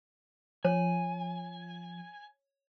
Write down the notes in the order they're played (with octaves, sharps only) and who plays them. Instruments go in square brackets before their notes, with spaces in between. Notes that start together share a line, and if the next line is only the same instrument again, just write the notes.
[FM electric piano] F3 [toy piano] C#5 [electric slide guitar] G#5